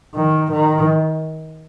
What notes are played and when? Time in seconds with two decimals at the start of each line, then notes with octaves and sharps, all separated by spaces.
0.15 D#3
0.51 D#3